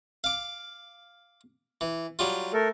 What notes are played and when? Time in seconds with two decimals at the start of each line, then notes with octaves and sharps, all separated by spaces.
0.24 F5 D6
1.81 E3
2.19 F#3 G3 F4
2.53 A3 A4 A#4